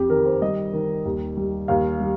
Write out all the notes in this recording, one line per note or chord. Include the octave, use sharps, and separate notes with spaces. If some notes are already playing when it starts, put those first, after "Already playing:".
Already playing: F2 G4
D#3 A#4
C5
G3 D#5
D#3
D#2
G3
D#2 F5
G3